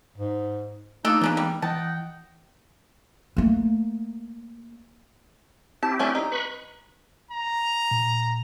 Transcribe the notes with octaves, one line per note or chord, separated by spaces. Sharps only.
G#2
A3 A#3 D4 D#4 F4 A4 D#6
C#3 E3 G#3 B3 D4 F4
G3
E3 D#5 F#5 G5 A5
A3 A#3
C4 E4 G4 A5
A3 C#4 D4
D#4
B4 B5 C#6
A#5
A#2